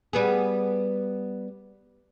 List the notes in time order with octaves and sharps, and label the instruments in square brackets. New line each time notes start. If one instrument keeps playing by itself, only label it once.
[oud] G3 B3 G#4